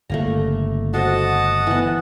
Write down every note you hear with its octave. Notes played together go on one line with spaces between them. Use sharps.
G1 C#3 A3 A#3 A#5
F#4 A4 C5 D#5 F#5 A5
E3 B3